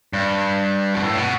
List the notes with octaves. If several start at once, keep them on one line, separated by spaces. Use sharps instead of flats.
G2
B2
A2
B2